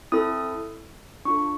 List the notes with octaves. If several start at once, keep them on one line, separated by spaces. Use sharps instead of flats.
C4 E4 A4 D#6
D4 F4 A4 C#6